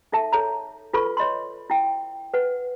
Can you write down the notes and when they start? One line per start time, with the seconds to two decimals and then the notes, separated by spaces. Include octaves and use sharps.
0.12 D#4 A4 E5 A5
0.32 A4 C#5 A#5
0.93 F4 A4 B4 B5 C#6
1.17 C#5 D#5 B5 C6
1.70 E4 G5
2.34 B4 F#5